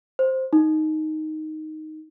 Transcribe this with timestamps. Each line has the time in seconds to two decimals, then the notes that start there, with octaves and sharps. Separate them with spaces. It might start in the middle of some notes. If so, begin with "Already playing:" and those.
0.19 C5
0.53 D#4